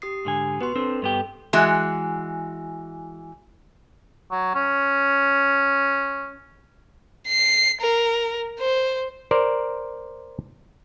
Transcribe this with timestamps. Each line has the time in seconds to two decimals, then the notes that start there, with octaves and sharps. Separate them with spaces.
0.02 G4 D#6 C7
0.25 G#2 D3 G#5
0.61 B3 F#4 B4 C6
0.76 C4 D4 A4
1.02 G2 B3 G4
1.53 E3 G#3 F#4
4.31 F#3
4.55 C#4
7.28 C7
7.81 A#4
8.60 C5
9.31 A#4 C5 D5